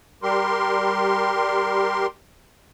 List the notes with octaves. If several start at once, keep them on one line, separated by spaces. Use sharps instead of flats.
G3 G4 A#4 C6